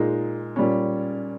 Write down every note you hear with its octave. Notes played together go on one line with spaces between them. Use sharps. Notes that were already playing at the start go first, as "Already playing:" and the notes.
Already playing: A#2 G#3 D#4
A#2 G3 C#4